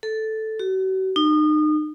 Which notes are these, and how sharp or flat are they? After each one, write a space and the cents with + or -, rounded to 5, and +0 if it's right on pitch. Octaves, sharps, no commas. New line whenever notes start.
A4 -5
F#4 +40
D#4 -35